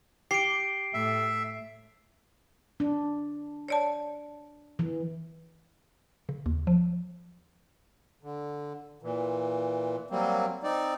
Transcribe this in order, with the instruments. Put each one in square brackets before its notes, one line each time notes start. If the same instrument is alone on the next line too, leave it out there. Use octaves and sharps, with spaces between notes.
[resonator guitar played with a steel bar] G4 [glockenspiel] C7 D7
[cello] A2 [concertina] E5
[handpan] D4
[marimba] C#5 D5 A5
[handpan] E3
[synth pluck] C#3
D#2
F3
[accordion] D3
A#2 E3
F#3 G3 A#3 C4
C4 D#4 D5